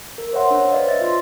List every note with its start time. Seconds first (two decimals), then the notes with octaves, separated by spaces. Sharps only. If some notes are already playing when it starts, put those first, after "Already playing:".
0.18 A#4
0.33 C5 C#5 E5 F#5 C6
0.51 D4 C#5
0.71 B4 C5 D5 D#5 F5
0.87 E5 A6
1.01 F4 C6